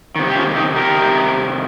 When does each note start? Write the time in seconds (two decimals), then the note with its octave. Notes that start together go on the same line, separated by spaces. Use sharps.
0.16 C3 D#3
0.28 G4
0.36 C#4 F4
0.56 D#4 G4
0.76 G4 A#4
0.96 C3 D#3